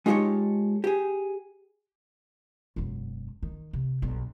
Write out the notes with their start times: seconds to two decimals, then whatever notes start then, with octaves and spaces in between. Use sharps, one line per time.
0.06 G#3 D#4 F4 G4 A4 C#5
0.84 G4 G#4
2.76 E1 F#2
3.43 D#3
3.73 C3
4.02 B1 G2